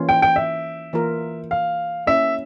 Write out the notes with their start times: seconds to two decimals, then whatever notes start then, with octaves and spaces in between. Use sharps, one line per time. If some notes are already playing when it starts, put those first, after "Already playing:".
Already playing: E3 A#3 C#4 F4
0.09 G5
0.22 G5
0.36 E5
0.93 E3 A#3 F4 A#4
1.51 F5
2.07 A#3 C#4 E4 E5